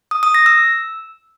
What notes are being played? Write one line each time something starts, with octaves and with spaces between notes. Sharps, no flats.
D#6
D#6
A#6
E6